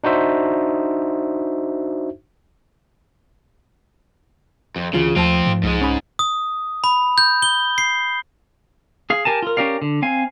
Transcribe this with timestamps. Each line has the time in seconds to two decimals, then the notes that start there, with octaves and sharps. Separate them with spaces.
0.04 D4 D#4 F#4 C5 E5
4.76 F2
4.93 D2 C#3 E3 F4
5.16 D#2 F3 A3 C4 F4 A5
5.47 G#2
5.63 C2 G#2 G#3
5.81 C#4 B5
6.19 D#6
6.84 B5
7.18 G6
7.42 G7
7.78 C7
9.10 G#4 F5
9.25 G4 A#4 G#5 A5
9.42 F4 A#4
9.57 C#4 G4 A#4 D5 F5
9.82 D3
10.02 C4 F5 G#5